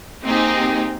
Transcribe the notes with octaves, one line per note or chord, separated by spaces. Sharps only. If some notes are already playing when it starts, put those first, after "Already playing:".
A#3 C4 D#4 G4 G#4